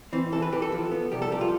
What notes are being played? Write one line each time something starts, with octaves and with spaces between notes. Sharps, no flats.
E3 C4
E3 A4
B4
E3 G4
A4
F3
B3
C2 G4
A4
F3 G4
F4